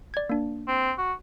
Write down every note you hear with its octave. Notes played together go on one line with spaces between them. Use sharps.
D5 G#6
A#3 D4
C4
F#4